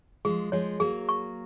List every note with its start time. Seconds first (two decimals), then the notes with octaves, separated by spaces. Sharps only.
0.25 F3 G#3 G#4
0.52 F3 G#3 C#5
0.80 F#3 A#3 G#4
1.09 C#6